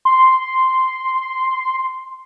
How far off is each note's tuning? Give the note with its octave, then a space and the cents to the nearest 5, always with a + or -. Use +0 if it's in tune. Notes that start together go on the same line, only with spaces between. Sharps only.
C6 -5